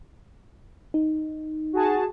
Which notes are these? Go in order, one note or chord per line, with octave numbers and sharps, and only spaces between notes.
D#4
F#4 G#4 A5